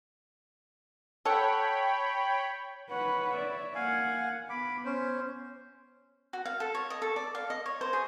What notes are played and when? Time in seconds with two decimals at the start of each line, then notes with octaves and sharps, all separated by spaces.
1.25 A4 C#5 F#5 G5 B5
2.90 B4 C#5 F#5
3.35 D5 E5
3.75 A#3 F5 F#5 G#5
4.50 B3 B5 D6
4.85 C#4 C5
6.33 F#4
6.45 F5
6.60 A4
6.75 C#5
6.90 D#5
7.02 A4
7.16 D5
7.35 F5
7.50 D#5
7.66 C#5
7.81 C5
7.93 G#4